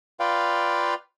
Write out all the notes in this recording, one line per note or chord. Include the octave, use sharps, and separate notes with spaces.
F4 B4 D5 F5 G5